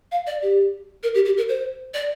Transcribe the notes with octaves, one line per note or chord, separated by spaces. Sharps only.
F5
D5
G4
A#4
G4
G4
A#4
C5
D5